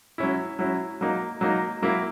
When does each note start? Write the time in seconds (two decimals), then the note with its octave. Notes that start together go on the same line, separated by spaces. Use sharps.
0.18 F#3 C#4 E4
0.59 F#3 C#4 E4
1.01 F#3 A#3 D#4
1.41 F#3 A#3 D#4
1.82 F#3 A#3 E4